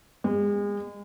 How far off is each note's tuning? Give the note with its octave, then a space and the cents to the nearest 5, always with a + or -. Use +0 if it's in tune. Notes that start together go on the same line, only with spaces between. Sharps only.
G#3 -35